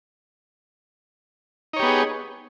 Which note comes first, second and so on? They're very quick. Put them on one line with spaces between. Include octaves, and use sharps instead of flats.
D#4 C#5 G4 B3 G#4